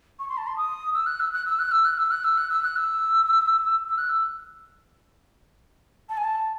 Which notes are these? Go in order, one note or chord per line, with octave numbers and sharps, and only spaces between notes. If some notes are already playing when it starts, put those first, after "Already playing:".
C#6
C6
A5
C6
D#6
E6
F#6
E6
F#6
E6
F#6
E6
F#6
E6
F#6
E6
F#6
E6
F#6
E6
E6
F#6
E6
A5
G#5
A5